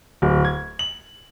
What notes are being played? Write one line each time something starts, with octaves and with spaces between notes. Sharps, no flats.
D1
G#6
F#7